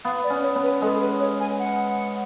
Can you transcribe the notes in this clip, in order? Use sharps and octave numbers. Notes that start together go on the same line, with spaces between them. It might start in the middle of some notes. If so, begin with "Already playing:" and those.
B3 F5
D5
C#4
C#5
B3
B4
G#3 A4
B4
C#5
G#5
F#5